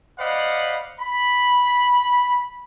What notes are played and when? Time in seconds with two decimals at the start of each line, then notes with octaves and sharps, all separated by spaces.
0.18 C5 D5 D#5 F5 F#5 B5
0.99 B5